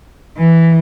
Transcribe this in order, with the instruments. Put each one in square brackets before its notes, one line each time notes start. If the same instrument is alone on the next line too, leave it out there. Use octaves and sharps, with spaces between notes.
[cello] E3